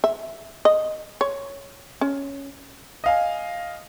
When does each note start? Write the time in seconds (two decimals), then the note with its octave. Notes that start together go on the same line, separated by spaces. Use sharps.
0.04 E5
0.65 D#5
1.21 C#5
2.01 C#4
3.04 D#5 F5 G#5